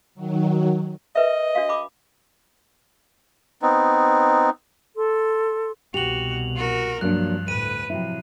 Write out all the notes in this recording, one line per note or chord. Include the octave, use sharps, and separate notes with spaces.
D#3 F#3
A#4 B4 D#5 E5
D4 F#4 F5
B5 D6
B3 C4 D#4
A4 C6
C2 B2 F#4 G4 F7 F#7
F#4 A#4
G2 F3 F#3 A#3 D4 F#6
D2 A2 B4 D#7
C3 F3 F#3 E4